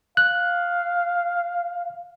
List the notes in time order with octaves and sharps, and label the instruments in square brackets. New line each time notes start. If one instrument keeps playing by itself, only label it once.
[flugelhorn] F5 [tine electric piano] F#6